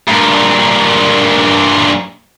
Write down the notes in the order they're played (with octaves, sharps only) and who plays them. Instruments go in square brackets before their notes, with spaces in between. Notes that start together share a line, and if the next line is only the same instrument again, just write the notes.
[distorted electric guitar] G2 A#2